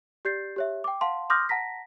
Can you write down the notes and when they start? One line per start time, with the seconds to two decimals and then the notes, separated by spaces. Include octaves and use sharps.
0.25 G4 D5 G6 A6 C7
0.56 G4 C#5 E5
0.84 G5 D6
1.01 F5 F#5 A5 C6
1.30 C6 D6 D#6 F6 G6 A#6
1.49 F#5 A5 A#5 A#6 B6